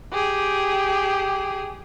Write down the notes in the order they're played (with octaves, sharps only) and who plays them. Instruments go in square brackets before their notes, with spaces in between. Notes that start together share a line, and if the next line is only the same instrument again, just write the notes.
[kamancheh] G4 G#4